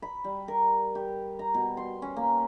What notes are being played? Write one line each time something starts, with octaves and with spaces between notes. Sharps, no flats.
B5
G3
A#4
G4
A#5
B2
C6
C#4
A#3